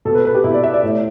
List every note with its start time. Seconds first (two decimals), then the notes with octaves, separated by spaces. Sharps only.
0.05 B2 A4
0.15 B4
0.25 B4
0.35 G4
0.44 B2 E4
0.54 D5
0.64 E5
0.74 D5
0.83 A2